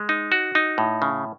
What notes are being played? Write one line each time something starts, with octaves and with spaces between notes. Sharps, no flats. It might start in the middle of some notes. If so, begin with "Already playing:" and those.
Already playing: G#3
D#4
F#4
D#4
A2
C#3